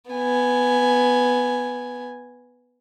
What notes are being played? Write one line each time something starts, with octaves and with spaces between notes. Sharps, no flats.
B3 G#5